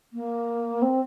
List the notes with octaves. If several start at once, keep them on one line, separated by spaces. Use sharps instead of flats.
A#3
C4